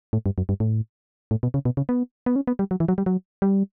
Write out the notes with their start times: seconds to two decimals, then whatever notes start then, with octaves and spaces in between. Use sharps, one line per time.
0.13 A2
0.26 G2
0.38 F#2
0.49 G2
0.60 A2
1.31 A2
1.43 B2
1.54 C#3
1.65 B2
1.77 C#3
1.89 B3
2.26 B3
2.36 C#4
2.47 B3
2.59 G3
2.71 F#3
2.80 E3
2.88 F#3
2.98 G3
3.06 F#3
3.42 G3